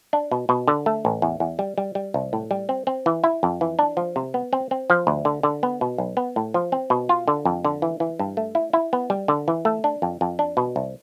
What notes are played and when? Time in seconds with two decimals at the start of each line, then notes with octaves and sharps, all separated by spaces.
0.13 D4
0.31 B2
0.49 B2
0.68 D3
0.86 A3
1.05 A1
1.22 E2
1.40 E2
1.59 G3
1.78 G3
1.95 G3
2.14 C2
2.33 A2
2.51 G3
2.69 C4
2.87 C4
3.06 E3
3.24 E4
3.43 F2
3.61 E3
3.79 D4
3.97 F3
4.16 C3
4.34 B3
4.53 C4
4.71 C4
4.90 F3
5.07 D2
5.25 D3
5.43 D3
5.63 B3
5.81 B2
5.98 B1
6.17 B3
6.36 A2
6.54 F3
6.72 C4
6.90 B2
7.09 F4
7.28 D3
7.45 F2
7.65 D3
7.82 E3
8.00 E3
8.19 G2
8.37 A3
8.55 E4
8.73 E4
8.93 B3
9.10 G3
9.28 D3
9.48 E3
9.65 A3
9.84 D4
10.02 F2
10.21 F2
10.39 D4
10.57 B2
10.76 C2